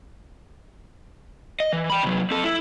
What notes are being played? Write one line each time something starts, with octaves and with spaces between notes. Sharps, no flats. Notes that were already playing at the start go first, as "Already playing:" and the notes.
D#5
E3
G5 B5
C3 F#3
C4 A4
E4